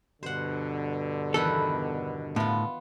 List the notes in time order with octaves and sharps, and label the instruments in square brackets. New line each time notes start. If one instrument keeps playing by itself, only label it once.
[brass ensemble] G2 B2 D3 [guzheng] C5 F#5
[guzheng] E2 D#3 B4 [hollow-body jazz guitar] A4
[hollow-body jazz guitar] A2 [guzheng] B3 F4